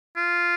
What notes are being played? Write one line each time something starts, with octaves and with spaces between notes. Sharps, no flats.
F4